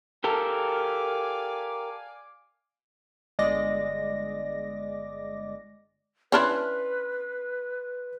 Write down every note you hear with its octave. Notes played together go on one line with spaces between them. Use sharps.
G4 A4 A#4 D5 F5 G#5
G1 G#3 D5 D#5 D6 A#6
C#4 D4 E4 B4 C6 F6 F#6